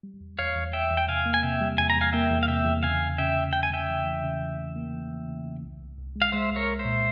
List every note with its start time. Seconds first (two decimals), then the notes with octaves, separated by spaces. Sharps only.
0.03 G3
0.21 E2
0.39 E2 C#5 F5
0.56 E2
0.73 E2 E5 G5
0.91 E2
0.97 G5
1.08 C3 F5 G#5
1.26 A#3
1.34 G#5
1.43 C3 E5 G5
1.61 G3
1.78 E2 G#5
1.90 A#5
1.95 E2
2.01 F5 G#5
2.13 A#3 E5 G5
2.31 E2
2.43 F5
2.48 C3 E5 G5
2.65 E2
2.83 C#3 F5 G#5
3.01 C#3
3.18 C#3 E5 G5
3.36 C#3
3.53 C#3 G5
3.63 G#5
3.71 C#3 E5 G5
3.89 E3
4.06 E3
4.24 C#3
4.41 E3
4.58 E3
4.76 A#3
4.93 E3
5.11 E3
5.28 C#3
5.45 C#3
5.63 C2
5.81 C2
5.98 C2
6.16 G#3
6.22 F5
6.32 G#3 C5 E5
6.51 C2
6.56 A#4 C#5
6.67 C2
6.79 C5 E5
6.85 A#2